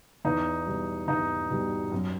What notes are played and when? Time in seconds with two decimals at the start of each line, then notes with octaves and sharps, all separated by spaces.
0.25 E2 D#4
0.66 B2 G3
1.08 E2 D#4
1.50 B2 G3
1.92 F#2